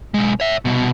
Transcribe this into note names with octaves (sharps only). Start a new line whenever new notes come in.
B1 G#3
C#5 E5
C2 B2